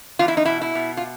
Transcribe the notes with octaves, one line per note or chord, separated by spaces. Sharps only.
E2 F4
E4
D#4
B2 E4
E4
B2
F4